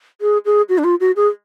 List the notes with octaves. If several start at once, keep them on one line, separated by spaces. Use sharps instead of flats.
G#4
G#4
F#4
D4
F4
F#4
G#4